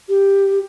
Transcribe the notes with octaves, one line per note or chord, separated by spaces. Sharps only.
G4